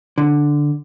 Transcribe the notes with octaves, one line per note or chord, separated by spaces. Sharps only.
D3